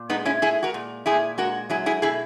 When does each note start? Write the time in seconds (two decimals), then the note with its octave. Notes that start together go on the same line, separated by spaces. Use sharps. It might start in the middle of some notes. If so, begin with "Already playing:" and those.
Already playing: A#2
0.10 G#3 B3 D#4
0.25 C#4 E4
0.42 G#3 E4 G#4
0.63 F#4 A#4
0.74 A#2
1.06 A#2 E4 G#4
1.38 G#3 F#4 A#4
1.70 F#3 E4 G#4
1.86 E4 G#4
2.02 B2 E4 G#4